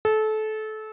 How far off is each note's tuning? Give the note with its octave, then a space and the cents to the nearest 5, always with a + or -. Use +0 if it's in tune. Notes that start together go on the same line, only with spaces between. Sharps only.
A4 -25